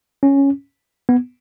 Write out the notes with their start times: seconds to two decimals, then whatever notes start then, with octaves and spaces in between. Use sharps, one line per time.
0.23 C#4
1.09 B3